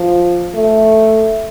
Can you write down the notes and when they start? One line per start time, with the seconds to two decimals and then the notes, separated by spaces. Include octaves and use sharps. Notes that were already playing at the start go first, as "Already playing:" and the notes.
Already playing: F3
0.55 A3